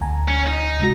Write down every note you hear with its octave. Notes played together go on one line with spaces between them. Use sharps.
D2 G#5 A#5
C#4
D#4
C3 G#3 F#4